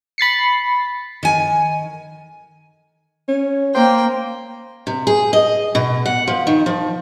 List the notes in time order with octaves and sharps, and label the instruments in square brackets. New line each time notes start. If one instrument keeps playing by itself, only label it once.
[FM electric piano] B5 A6 C7 C#7
[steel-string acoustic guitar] D#3 G#5
[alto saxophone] C#4
[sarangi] A#3 [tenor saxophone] C5 [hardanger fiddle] G5
[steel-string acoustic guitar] C3
G#4
D#5
B2
F#5
F3
D#3
F3